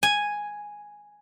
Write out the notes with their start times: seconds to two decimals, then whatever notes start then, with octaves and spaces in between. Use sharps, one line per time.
0.03 G#5